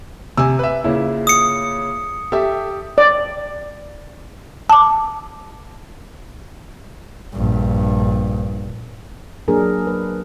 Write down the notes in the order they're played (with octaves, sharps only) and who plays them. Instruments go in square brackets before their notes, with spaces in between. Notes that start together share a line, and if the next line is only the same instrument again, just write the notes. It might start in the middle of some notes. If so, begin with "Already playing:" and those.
[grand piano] C3 [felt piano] G#5 E6
[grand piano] B4 E5
[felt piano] A#2 C#3 [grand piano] E4
[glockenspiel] D#6 C#7
[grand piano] G4 [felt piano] A4 E5
[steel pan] D5
[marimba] A5 D6
[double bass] A#1 G2
[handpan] F#3 A#3 D4 G#4 A#4
B4